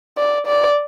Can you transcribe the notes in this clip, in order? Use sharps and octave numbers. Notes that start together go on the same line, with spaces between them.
D5
D5